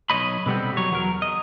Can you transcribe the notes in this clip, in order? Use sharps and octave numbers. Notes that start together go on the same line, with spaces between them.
B1 G2 C#5 D#5 B5
B2 D3 G3 B3 C4
F#3 C#5
E2 F#3 A#4
D#5